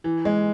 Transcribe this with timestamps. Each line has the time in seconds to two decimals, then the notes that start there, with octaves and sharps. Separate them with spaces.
0.04 E3
0.25 G#3